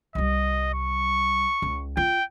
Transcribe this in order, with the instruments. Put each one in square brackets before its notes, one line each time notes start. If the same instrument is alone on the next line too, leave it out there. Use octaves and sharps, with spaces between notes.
[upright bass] C2 G3 [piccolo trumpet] D#5
[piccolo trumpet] C#6
[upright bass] C#2
[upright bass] F4 [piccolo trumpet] G5